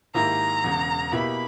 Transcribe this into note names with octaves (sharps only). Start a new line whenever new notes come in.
G#2 D#3 A#3 E4 G4 A#5
E1 E2 C#3
B2 A#3 E4 G4 B5